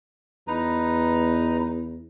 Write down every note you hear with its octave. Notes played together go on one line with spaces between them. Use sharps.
E2 D#4 B4 A#5